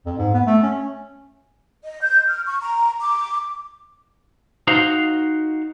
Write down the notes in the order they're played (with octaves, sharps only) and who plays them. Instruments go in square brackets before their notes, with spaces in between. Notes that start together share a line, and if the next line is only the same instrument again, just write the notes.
[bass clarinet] F2
G#2
B3
A3
C#4
[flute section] D#5
G6
F6
C#6
A#5
D6
[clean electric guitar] D#4 F#4 C5 F5